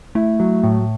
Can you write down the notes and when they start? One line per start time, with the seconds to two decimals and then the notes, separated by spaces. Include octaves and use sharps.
0.15 A3 E4
0.40 F#3
0.63 A2